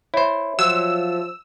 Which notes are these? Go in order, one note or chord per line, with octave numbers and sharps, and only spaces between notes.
E4 C5 C#5 E5
F3 F#3 E6